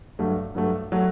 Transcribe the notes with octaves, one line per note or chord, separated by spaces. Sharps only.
G2 F#3 A3
G2 F#3 A3
F#3 A3